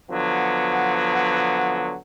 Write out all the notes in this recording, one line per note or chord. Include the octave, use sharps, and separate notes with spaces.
D3 F3 F#3 B3